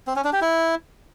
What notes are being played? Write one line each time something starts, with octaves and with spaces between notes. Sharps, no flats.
C4
C#4
D4
G4
E4